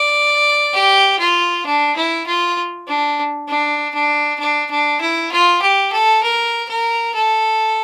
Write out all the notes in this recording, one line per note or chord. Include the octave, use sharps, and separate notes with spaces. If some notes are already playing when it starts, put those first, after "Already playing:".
Already playing: D5
G4
F4
D4
E4
F4
D4
D4
D4
D4
D4
E4
F4
G4
A4
A#4
A#4
A4